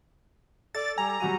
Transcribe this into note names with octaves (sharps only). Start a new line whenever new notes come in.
A4 D5 A6
G3 G#5 A#5
F#3 G3 F#4 D#7